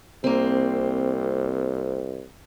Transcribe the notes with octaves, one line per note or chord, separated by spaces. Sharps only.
C2 A#3 C4